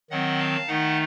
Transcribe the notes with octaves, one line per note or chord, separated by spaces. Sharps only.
D#3 F#3 C4 D#5 F#5
F5 A5
D#3 A3 D#4 D#5 F#5